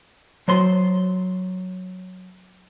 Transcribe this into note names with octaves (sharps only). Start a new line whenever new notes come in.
F#3 C5 C6